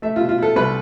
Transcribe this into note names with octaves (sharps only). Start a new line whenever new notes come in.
A3 E5
F4
B2
F4
E4 A4
C2 B4